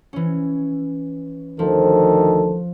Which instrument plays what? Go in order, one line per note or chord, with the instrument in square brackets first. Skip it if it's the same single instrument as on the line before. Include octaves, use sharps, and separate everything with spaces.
[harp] E3 C#4
[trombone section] D2 D#3 A4 [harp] F3